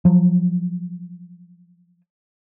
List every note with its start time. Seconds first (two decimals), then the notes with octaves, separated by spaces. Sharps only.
0.05 F3 F#3